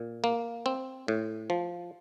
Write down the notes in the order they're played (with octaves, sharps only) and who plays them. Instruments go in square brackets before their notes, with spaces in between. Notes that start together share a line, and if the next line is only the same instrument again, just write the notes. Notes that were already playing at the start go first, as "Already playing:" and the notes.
Already playing: [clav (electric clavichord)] A#2
A#3
C4
A2
F3